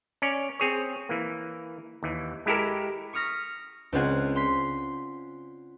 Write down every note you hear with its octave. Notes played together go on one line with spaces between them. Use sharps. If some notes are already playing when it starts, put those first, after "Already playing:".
C#4 C#5 D5
C4 G#4 C#5
E3 A#3
D#2 E3
G#3 E4 G4 A4 A#4
C#6 D#6 F6 A#6 B6
C#2 C4 D4 F4 F#5 G#5
C6 B6